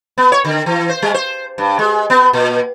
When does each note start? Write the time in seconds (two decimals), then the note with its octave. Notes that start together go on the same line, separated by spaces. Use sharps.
0.18 B3
0.32 C#5
0.45 D3
0.66 E3
0.89 C5
1.02 G3
1.14 C5
1.58 G2
1.79 G#3
2.10 B3
2.33 A#2